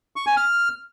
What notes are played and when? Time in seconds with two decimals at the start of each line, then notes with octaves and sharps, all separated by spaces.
0.16 C#6
0.26 G#5
0.37 F6